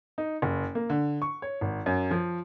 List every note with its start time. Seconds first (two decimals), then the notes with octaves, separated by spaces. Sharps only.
0.18 D#4
0.42 F#1
0.75 A#3
0.90 D3
1.22 C#6
1.42 C#5
1.61 G#1
1.86 F#2
2.11 F3